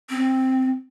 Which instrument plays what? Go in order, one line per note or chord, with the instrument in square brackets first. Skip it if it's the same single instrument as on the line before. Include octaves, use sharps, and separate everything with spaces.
[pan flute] C4